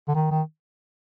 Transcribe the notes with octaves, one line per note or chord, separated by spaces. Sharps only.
D3
D#3
D#3